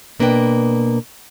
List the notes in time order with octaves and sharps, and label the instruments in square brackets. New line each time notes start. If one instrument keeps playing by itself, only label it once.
[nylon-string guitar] B2 A#3 D4 B4 C#5 G5